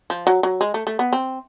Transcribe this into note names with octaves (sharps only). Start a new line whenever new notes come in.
F3
F#3
F#3
G#3
A3
A3
B3
C4